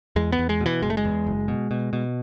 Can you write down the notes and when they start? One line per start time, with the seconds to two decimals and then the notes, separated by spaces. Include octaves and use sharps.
0.16 E2 G#3
0.32 B3
0.39 E2
0.49 G#3
0.61 B2
0.66 E3
0.82 F#1 G#3
0.90 A3
0.97 G#3
1.05 E2
1.27 F#1
1.48 B2
1.71 B2
1.93 B2